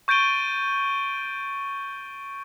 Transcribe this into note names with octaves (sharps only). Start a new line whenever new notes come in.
C#6 G6 A6 D7 D#7 G7